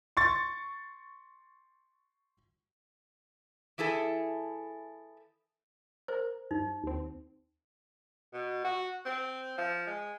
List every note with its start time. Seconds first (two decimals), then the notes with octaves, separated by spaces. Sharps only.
0.17 C6 C#6 A6
3.78 E3 E4 G#4 A4
6.08 A#4 C5
6.51 G2 D#4
6.84 D#2 C4
8.33 B2
8.65 F#4
9.05 C4
9.58 F3
9.87 G#3